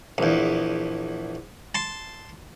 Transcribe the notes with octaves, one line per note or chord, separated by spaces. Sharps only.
A#1 E2
A5 C6